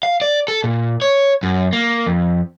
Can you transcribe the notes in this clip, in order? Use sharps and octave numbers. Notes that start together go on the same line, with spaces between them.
F5
D5
A4
A#2
C#5
F#2
A#3
F2